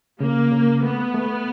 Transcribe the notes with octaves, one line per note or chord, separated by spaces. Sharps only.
C#3 A#3
C#3
A3 B3
A3